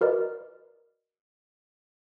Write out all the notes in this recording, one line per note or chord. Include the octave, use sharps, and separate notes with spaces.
F#4 A#4 B4 D5 D#5